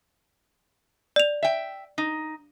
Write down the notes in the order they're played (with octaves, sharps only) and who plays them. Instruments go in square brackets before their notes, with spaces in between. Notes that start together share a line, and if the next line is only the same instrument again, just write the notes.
[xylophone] D5 F7
[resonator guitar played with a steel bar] E5 G5
D#4